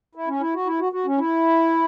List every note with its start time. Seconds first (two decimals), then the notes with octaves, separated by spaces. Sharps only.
0.15 E4
0.28 C#4
0.40 E4
0.54 F#4
0.66 E4
0.80 F#4
0.92 F#4
1.06 C#4
1.18 E4